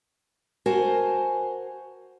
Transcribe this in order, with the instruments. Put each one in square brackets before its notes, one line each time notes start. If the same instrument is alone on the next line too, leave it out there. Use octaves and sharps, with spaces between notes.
[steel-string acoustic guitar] F#4 A#4 C5 G#5 A5